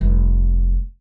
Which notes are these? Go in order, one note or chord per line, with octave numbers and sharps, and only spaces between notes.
F1 G3